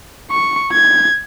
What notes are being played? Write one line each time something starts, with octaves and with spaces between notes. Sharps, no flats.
C#6
G#6